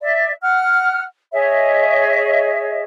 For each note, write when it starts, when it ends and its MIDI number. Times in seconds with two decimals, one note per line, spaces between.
0.01 0.32 74
0.01 0.32 76
0.42 1.03 78
0.42 1.03 89
1.32 2.82 68
1.32 2.82 73
1.32 2.82 75
1.32 2.82 76